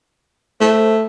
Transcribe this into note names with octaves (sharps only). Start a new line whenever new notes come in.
A3 C5